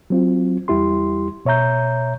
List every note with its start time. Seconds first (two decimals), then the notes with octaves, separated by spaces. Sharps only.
0.10 F#3 C4 F4
0.68 E2 G3 E4 G4 C6
1.45 B2 C#5 E5 A#5 G6